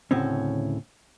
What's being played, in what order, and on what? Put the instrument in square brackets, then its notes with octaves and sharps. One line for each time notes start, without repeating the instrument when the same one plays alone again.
[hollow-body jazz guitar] D2 A2 C#3 C4 C#4